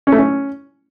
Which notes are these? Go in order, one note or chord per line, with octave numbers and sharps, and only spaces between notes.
C#4
A3
C#4